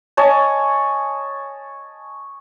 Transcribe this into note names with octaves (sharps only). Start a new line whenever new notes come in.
C#5 D#5 G#5 A5